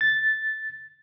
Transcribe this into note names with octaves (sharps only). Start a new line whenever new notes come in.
A6